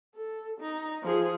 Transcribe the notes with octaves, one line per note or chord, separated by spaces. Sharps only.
A4
D#4
F3 G#4